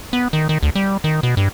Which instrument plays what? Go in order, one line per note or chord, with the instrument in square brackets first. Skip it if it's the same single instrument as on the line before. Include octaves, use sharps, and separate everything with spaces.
[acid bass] B3
D#3
D#3
D2
G3
D#3
B2
G2